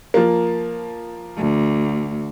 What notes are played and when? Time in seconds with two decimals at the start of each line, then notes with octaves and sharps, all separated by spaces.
0.14 F3 A#3
1.37 D2